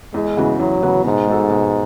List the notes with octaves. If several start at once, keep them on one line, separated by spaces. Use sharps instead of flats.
E2 G#3
C#3 E3 B3 F#4
E2 F#3
C#3 E3 B3 F#4
G#2 B2
G#3 D#4 F#4 A4
B2